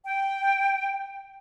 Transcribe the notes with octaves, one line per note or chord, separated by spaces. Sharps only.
G5